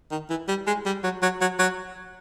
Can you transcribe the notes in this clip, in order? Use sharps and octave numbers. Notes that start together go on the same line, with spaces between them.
D#3
E3
G3
G#3
G3
F#3
F#3
F#3
F#3